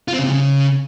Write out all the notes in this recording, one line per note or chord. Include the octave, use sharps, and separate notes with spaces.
F4
C4
C#3
C3
C#3